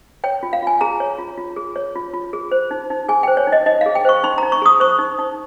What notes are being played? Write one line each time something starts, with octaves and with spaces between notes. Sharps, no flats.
C#5 G5
F4
F5
F4 G#5
G#4 A#5
C#5
F4
F4
G#4
C#5
F4
F4
G#4
C5
D#4
D#4
G#4 G#5
G5
C5
C#5
D#4
D#5
D#4 D#5
F5
G#4
G5
C5 C#6
D#4 C6
A#5
D#4
C#6
G#4 D#6
C5 C#6
D#4
D#4